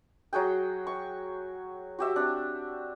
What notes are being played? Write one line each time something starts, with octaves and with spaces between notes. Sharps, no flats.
F#3 F#4 G#4 G5
C#6
F#4 G4 E5
C4 D4